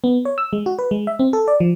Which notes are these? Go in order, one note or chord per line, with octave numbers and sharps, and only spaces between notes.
B3
C#5
E6
G#3
F#4
B4
G#3
E5
C4
A4
D5
F3